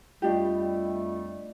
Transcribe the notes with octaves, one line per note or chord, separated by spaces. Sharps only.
F2 G3 A3 D4 F4 G4 D#5